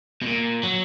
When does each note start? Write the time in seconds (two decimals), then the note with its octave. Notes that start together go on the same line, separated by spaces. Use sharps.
0.22 B2
0.27 A#2
0.63 F#3